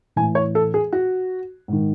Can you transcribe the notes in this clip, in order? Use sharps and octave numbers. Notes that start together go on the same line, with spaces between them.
A2 E3 G#5
C#5
A4
G#4
F#4
G#2 D#3